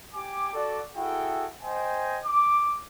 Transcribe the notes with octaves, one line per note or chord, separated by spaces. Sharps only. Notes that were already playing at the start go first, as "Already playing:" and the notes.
G4 G#5 D6
F#4 A4 D5
E4 F#4 G#4 A4 G5
C5 D#5 G5 G#5
D6